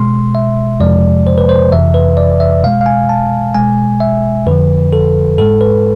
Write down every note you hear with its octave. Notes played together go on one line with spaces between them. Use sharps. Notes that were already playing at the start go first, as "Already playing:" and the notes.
Already playing: B2 G#3 C6
E5
F2 C3 F3 G#3 D5
C5
B4
C5
F2 C3 E3 E5
B4
D5
E5
B2 G#3 F5
F5
G#5
A5
B2 G#3 G#5
E5
F2 D3 F3 B4
A4
G#2 G#3 A4
B4